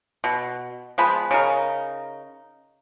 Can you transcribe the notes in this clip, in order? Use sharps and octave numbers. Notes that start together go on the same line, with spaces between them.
B2
F3 G#3 B3 B5
C#3 D#4 A#4